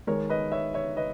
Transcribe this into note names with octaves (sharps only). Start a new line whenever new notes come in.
D#3 G#3 D#4 A#4 C#5
B4 D#5
C#5 E5
C#5 E5
B4 D#5